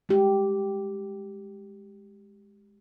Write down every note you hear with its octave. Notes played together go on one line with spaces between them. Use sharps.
G#3 G4